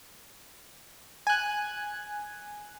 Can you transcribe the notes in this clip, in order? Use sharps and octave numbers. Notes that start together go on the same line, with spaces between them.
G#5 F#6